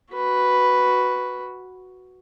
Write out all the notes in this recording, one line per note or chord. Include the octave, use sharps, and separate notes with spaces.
F#4 B4